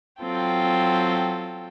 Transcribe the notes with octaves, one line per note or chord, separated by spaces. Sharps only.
F#3 C4 F4 A4 G5